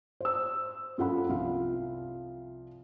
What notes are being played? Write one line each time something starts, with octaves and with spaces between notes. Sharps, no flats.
C5 E6
F#2 F4 A4 F#5 B5
C2 F3 F5